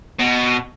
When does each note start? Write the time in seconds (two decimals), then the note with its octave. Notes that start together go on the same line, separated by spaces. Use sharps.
0.19 B2